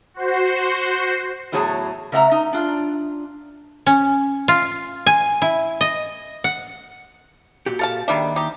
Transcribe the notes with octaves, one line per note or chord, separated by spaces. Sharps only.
F#4 C5
E2 A2 F#3 G#4 C#5 A5
C#3 A3 E5 F#5 A#5
D#4
D4 F4
C#4
F4
G#5
E4
D#5
F#5
A#2 F#4 G4
A4 F5 A5
D#2 D#3 G3 D4 E5
D#4 G4